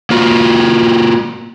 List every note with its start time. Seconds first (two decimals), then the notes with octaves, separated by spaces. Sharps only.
0.10 A#3 F4 F#4